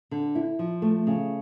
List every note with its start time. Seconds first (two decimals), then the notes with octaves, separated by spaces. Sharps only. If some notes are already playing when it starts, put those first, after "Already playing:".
0.11 D3
0.35 E4
0.59 F3
0.82 A3
1.07 C#3